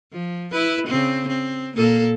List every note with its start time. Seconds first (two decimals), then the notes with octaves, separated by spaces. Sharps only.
0.13 F3
0.52 E4 B4
0.87 C#3 C4
1.28 C4
1.75 A#2 A#3 A4